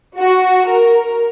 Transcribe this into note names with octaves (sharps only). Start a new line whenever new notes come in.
F#4
A#4